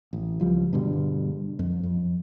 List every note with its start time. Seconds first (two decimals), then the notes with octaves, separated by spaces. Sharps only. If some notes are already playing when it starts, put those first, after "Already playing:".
0.13 A1
0.40 C#2 F3 G3
0.73 G2 B2 D3 G3
1.59 F2
1.83 F2